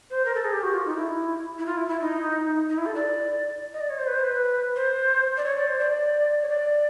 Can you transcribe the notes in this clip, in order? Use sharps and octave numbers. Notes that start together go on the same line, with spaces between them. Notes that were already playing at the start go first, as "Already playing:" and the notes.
C5
A#4
A4
G#4
G4
F#4
F4
D#4
E4
E4
F4
E4
E4
D#4
D#4
E4
A4
D5
D#5
D5
C#5
C5
B4
C5
B4
C5
D5
C#5
D5
C5
D5
C#5
D5